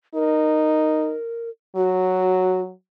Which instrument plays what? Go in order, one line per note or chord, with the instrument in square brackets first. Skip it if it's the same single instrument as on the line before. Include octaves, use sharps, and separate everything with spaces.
[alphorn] D#4 [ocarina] A#4
[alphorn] F#3 [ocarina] F#4